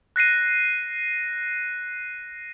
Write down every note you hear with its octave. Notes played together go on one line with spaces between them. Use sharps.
F#6 A#6 C7 D#7